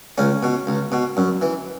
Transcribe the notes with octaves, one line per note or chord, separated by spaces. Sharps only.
C#2 C#4
B2
C#2
B2
F#2
E3